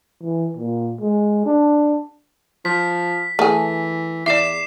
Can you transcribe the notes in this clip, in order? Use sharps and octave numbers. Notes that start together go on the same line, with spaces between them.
E3
A#2
G#3
D4
F3 B6
E3 A3 G#4
E2 D5 E5 D6 C7 E7